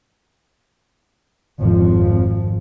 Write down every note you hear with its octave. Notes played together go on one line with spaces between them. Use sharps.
G#1 F2 G#2 F3